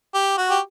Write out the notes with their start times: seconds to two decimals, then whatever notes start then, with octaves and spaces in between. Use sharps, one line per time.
0.14 G4
0.38 F#4
0.50 G4